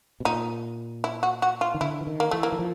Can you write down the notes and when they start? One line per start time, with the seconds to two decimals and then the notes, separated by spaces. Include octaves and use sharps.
0.20 B2
0.25 A#2 D#4
1.04 E4
1.23 F#4
1.42 F#4
1.61 F4
1.75 D#3
1.81 D3 E4
2.01 E3
2.07 D#3
2.20 A#3
2.31 E3 A3
2.43 A#3
2.52 E3
2.59 F3